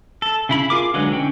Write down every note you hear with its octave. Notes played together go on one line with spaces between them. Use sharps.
A4
C#3 E4 B5
F4 G#4 A#4 D6
D3 F#3 G#3 B4
D3 E3 C#4 G5